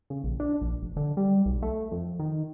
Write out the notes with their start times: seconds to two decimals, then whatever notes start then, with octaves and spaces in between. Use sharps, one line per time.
0.10 C#3
0.24 A#1
0.40 D4
0.61 A#1
0.81 F1
0.96 D3
1.17 G3
1.46 B1
1.62 A3
1.91 F2
2.20 D#3